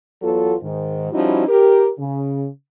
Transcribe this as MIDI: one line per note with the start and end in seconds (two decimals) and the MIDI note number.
0.22 0.55 40
0.22 0.55 54
0.22 0.55 59
0.22 0.55 65
0.22 0.55 69
0.62 1.09 44
0.62 1.09 51
1.12 1.44 53
1.12 1.44 55
1.12 1.44 61
1.12 1.44 63
1.12 1.44 64
1.12 1.44 66
1.48 1.89 67
1.48 1.89 70
1.99 2.47 49